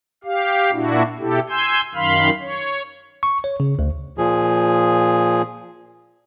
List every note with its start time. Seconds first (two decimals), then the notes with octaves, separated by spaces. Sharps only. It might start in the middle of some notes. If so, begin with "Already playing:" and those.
0.24 G4 F5
0.71 A#2 D4 E4 F#4
1.19 B2 E4 G4 A4
1.49 G#5 C6 E6 G6
1.95 F#2 D#3 F5 B5 C6 F6
2.40 C#5
3.23 C#6
3.44 C#5
3.60 C#3
3.79 D2
4.18 A#2 F3 G#4